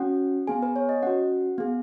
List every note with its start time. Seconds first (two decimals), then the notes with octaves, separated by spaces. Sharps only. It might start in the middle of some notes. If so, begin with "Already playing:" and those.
Already playing: C#4 F#4 F#5
0.47 B3 G#4 G#5
0.62 B4
0.76 C#5
0.89 D#5
1.03 C#4 F#4 F#5
1.58 B3 G#4